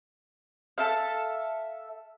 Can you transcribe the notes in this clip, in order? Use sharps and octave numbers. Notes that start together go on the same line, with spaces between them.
A4 E5 F5